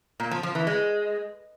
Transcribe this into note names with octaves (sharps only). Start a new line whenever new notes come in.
A#2
F3
F3
E3
G#3